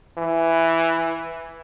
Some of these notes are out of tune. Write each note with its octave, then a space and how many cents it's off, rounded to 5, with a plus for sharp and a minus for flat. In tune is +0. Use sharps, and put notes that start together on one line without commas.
E3 +5